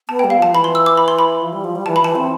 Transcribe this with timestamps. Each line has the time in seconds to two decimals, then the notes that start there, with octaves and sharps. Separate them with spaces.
0.09 B3 A5
0.19 G5
0.24 G3
0.30 F5
0.39 F3 A5
0.53 E3 B5
0.64 C6
0.75 E6
0.86 D6
0.97 B5
1.08 C6
1.19 B5
1.42 F3
1.53 G3
1.64 F3
1.75 G3
1.86 E3 A5
1.96 B5
2.01 E3 A5
2.15 C4